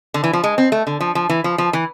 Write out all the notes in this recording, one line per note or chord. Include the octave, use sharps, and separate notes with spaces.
D3
E3
F3
G#3
C4
A3
D3
F3
F3
E3
F3
F3
E3